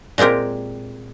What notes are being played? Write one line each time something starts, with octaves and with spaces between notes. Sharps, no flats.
A#2 G#3 C4 G4 A#4